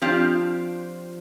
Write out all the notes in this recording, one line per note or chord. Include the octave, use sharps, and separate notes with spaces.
F3 C4 D4 F4 G4